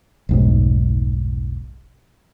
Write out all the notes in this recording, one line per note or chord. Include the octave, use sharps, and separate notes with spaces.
F1 B1 G#2